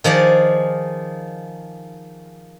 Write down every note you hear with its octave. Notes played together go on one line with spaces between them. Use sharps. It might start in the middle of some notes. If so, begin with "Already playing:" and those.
D#3 F3 G#4 D5